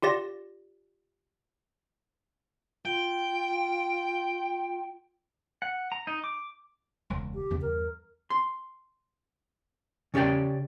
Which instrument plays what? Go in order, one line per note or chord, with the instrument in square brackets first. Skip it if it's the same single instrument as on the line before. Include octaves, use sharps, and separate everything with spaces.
[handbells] F4 G4 D5 A#6
[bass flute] F4 [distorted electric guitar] G5
[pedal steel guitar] F#5
A#5
D#4
D6
[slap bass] E1 C#2
[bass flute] G4
[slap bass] E2 C#3 B3
[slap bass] E2 G2 [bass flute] A#4
[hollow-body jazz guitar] C6
C#3 C#4 G4 D5 G5